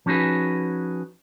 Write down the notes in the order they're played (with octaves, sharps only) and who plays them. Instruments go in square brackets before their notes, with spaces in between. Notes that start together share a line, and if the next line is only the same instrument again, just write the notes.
[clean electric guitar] F3 C#4 D#4 F#4 G#4 B4